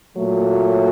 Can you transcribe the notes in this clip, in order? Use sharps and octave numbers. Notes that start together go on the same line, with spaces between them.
A#2 F#3 A3